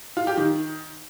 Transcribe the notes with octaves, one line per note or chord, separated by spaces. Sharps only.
F4
G4
D#3